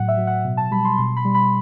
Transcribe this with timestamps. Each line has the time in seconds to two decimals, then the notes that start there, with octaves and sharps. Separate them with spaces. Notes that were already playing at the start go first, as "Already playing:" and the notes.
Already playing: A2 F#3 F#5
0.08 E5
0.17 F#3
0.27 F#5
0.45 B2
0.57 A5
0.71 G3 B5
0.85 C6
0.98 B2 C6
1.16 B5
1.25 G3
1.35 B5